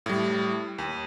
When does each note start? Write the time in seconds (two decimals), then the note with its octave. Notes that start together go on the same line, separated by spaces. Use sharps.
0.06 A2 G3
0.78 D#2